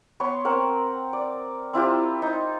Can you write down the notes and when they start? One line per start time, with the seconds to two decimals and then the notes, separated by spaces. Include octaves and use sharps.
0.20 B3 C#5 C6 C#6
0.45 C4 A#4 F#5
1.13 D5
1.73 C4 E4 F4 G4
2.22 D#4